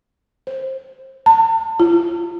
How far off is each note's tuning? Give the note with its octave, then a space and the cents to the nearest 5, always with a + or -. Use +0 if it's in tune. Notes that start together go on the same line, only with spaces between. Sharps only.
C5 +10
A5 +45
F4 -35